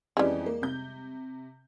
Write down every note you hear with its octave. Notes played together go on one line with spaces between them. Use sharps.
F2 E3 G3 G#3 C#4
A#3
C3 G6